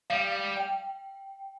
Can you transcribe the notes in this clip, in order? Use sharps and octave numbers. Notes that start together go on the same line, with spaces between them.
G3 F5
G5